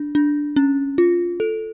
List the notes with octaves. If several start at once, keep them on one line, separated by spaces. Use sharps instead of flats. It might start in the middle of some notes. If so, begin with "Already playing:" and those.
Already playing: D4
D4
C#4
F4
A4